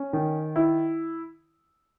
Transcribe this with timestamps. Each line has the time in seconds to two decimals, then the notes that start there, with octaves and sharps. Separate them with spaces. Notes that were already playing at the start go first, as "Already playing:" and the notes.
Already playing: C#4
0.13 D#3
0.56 E4